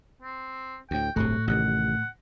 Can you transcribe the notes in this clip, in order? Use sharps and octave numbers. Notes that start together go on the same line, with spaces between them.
C4
D2 A2 G5
D1 G1 A2 C3 A3 F#4
A1 C3 D#3 F#5